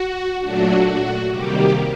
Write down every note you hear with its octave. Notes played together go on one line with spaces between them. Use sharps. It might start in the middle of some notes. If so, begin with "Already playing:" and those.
Already playing: F#4
A#2 F#3 A3 D4 F#4
C3 D#3 G3 A#3 G4